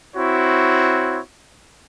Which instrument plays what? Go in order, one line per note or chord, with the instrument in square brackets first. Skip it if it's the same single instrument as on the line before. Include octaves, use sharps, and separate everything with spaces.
[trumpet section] C4 E4 F#4 C#5